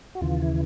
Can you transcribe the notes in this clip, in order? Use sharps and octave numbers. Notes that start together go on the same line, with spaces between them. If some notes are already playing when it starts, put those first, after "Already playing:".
F#4
D#2 C#3 E3 F4
E4